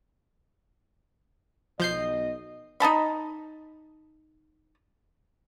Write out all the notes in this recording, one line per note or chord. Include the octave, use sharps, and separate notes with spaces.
B1 F3 D#5 G6 C7
D#4 D#5 A5 B5